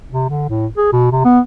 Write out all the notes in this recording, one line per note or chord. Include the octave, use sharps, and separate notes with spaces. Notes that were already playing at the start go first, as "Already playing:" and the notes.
C3
D3
A2
G#4
B2
C3
B3